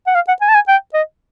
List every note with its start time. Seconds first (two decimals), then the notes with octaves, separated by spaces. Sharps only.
0.07 F#5
0.15 F5
0.28 F#5
0.41 G#5
0.49 A5
0.55 G#5
0.68 G5
0.94 D#5